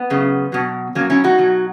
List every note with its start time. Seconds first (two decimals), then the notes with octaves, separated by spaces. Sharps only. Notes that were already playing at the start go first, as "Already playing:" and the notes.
Already playing: B3
0.10 F#2 C#3
0.52 B2 F#3
0.95 B2 F#3 A#3 C#4
1.10 C#4 E4
1.24 D#4 F#4
1.38 B2 F#3